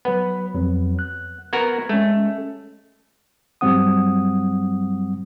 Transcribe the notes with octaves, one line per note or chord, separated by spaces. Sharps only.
F#3 B3 B4 B5
F2 F#3
F#6
B3 F#4 A#4 G#6
G#3 A3 C#4
G2 F#3 G3 C4 F#5 D#6